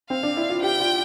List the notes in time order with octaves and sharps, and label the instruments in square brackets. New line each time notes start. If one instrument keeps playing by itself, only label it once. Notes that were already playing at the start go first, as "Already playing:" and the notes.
[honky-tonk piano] C4 [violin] F5
[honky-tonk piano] D4
E4
F4
[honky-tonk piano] G4 [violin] G5
[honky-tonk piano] F4